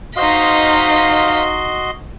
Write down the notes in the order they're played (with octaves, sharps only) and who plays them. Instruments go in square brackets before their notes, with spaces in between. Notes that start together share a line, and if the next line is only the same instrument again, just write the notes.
[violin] D#4 B6 [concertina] F#4 D#5 C6 [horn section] C5 F5